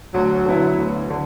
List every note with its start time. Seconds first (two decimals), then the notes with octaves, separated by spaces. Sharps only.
0.14 D2 F#3
0.46 D3 B3 E4
0.78 D2
1.10 D3